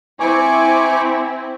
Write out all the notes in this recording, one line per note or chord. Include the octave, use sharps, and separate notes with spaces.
C4 E4 G#5 C#6 D6